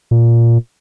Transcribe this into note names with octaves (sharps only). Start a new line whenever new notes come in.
A#2